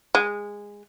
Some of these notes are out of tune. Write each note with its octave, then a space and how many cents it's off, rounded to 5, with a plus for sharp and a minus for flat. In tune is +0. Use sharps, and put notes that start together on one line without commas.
G#3 -15